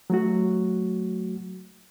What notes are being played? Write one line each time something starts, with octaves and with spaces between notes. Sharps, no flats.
F#3 A3 F#4